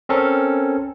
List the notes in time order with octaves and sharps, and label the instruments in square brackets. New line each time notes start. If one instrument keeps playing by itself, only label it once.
[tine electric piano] C4 C#4 A4 A#4